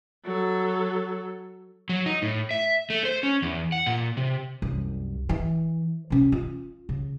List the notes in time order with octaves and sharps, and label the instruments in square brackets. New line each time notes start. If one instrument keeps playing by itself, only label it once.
[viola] F#3 A4
[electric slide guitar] F#3
D#4
A2
E5
A3
C5
C#4
E2
F#5
A#2
C3
[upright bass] C2 F#2
E3
C3 C#4
F4
C#3